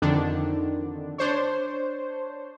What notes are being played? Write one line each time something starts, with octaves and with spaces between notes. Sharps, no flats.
F2 D3 D#3 D4
D4 C5 C#5